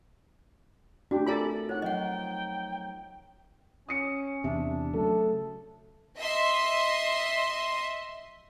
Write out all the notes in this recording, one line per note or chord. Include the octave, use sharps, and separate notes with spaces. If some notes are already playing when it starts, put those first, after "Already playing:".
A3 C4 D4 F#4 G4
F4 A4 A#4 D5 G#5 A#5 B5
D#4 C#5 F#5 F#6
F3 F#3 D#4 D#5 F#5 G5
C#4 D#6 C#7
E2 C3 D4 E5
C#3 F#3 A3 A4
D#5 E5 C6